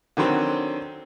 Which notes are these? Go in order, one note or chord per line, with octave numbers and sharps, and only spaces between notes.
D3 D#3 F#3 C4 C#4